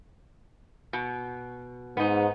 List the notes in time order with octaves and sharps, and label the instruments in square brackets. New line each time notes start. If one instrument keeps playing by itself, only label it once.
[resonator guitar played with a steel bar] B2
[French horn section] G#2 [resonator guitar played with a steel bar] B3 D#4